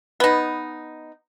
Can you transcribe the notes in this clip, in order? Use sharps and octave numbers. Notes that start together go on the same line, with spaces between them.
B3 D#4